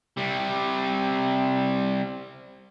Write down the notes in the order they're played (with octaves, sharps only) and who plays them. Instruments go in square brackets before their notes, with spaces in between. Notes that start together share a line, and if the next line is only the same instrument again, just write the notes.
[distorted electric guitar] C3 G3